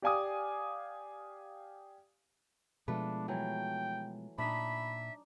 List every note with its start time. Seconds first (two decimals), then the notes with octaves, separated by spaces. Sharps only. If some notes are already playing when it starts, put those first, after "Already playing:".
0.02 G4 D5 F5 G#5 D6 D#6
2.88 B2 F3 G#3 A3 D4 B4 F5
3.28 E3 F#3 G5
4.38 A#2 D4 D#4 E5 B5